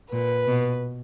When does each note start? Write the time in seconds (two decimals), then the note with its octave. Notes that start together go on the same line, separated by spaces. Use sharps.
0.12 A#2 B4
0.47 B2